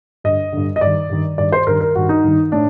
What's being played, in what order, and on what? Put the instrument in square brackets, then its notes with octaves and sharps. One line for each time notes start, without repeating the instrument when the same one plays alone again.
[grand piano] G2 D3 D#5
G2 D3
D#5
G2 D#3 D5
G2 D#3
G2 D#3 D5
C5
G2 D#3 A#4
A#4
G2 D#3 F#4
D#4
G2 D#3
A2 D4